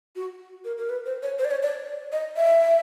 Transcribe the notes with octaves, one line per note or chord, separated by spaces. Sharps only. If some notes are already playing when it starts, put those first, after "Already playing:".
F#4
A#4
A#4
B4
C5
C#5
C5
D5
C#5
D5
D#5
E5